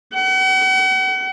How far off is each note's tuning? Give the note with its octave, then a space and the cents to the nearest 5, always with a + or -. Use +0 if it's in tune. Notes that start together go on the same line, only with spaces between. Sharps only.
F#5 +40